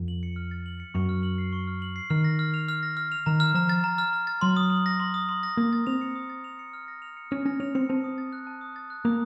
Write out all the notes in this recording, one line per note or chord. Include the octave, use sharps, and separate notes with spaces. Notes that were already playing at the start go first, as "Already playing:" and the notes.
Already playing: F2
F#7
C#7
F6
A6
F#7
C#7
F#2 C#6
F6
F#7
C7
C#6
F6
F#7
C7
D#3 F6
A#6
F6
F7
F6
A#6
F6
F7
D#3 A#5
F6
F3 A#5
A6
A#5
F6
A#5
A6
F#3 C6
D#6
C6
A#6
C6
D#6
C6
A#6
A#3 D#6
A6
C4 F7
C#7
D#6
A6
F7
C#7
F6
A#6
F7
C#7
C#4 F6
C#4 A#6
C#4 F7
C4 C#7
C4 A5
D#6
A6
F#6
A5
D#6
A6
F#6
A#3 D#6